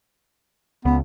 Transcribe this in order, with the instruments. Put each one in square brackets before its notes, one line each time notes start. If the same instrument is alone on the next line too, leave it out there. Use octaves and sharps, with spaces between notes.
[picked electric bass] C#2 [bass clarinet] B3